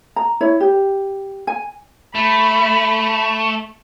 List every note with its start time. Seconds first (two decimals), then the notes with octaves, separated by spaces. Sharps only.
0.16 A#5
0.41 E4 C#5
0.60 G4
1.47 G#5
2.15 A3 B5